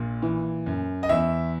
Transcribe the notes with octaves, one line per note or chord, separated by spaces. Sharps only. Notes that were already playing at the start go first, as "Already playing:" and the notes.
Already playing: A#1 A#2
E3
F#2
D#5
E2 E5